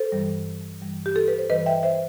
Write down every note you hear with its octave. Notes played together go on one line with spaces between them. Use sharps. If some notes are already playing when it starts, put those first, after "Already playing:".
Already playing: A4 C5
G2 E3 G3
G2 E3 G3
G4
A4
B4
C5
G2 E3 G3 B4 D#5
E5 G5
C5 E5